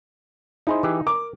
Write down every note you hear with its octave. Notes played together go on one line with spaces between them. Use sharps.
D#4 E4 G#4 C5
E3 G4 G#4
A#4 D6